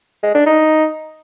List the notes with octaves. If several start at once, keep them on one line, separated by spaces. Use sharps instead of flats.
G#3
D4
D#4